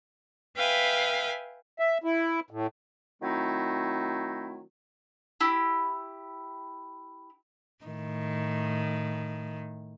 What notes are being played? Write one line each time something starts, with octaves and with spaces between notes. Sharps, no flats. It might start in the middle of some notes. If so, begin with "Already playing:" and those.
B4 E5 F5 G5 G#5
E5
E4
A2
D#3 F#3 A3 C4 D#4 E4
E4 G4
A2 D#3